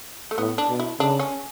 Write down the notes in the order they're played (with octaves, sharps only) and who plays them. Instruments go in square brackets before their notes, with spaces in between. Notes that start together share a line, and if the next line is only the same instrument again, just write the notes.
[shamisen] A3
[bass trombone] A2 [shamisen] B3
[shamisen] D4
[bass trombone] B2
[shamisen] E4
[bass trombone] C#3 [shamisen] D4
[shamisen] C#4